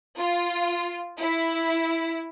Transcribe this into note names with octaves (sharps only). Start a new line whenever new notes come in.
F4
E4